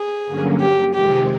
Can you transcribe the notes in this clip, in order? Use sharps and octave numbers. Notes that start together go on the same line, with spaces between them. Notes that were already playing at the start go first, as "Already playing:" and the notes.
Already playing: G#4
G2 D3 F#3 A#3 C#4
G4
F2 C3 D#3 G#3 C4 G4